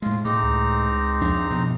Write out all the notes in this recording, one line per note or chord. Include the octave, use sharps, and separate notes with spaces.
A2 G#3 F4
A2 C4 D#4 G#4 A#5 D6
C#2
F2 D4
G2 B2 F3